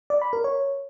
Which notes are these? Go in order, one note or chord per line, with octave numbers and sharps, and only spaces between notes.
D5
B5
A#4
C#5